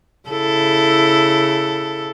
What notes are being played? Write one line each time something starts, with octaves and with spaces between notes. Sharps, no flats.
C#3 E4 A4